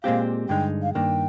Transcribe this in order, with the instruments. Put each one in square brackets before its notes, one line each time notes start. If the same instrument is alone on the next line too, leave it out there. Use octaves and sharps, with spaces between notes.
[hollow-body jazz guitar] A#2 G#3 C4 G4 [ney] F5
[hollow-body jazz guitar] G2 D3 G#3 D#4 [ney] G5
[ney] F5
[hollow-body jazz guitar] G2 D#3 A#3 D4 [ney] G5